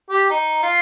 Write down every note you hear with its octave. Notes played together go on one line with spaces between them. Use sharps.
G4
D#4
F4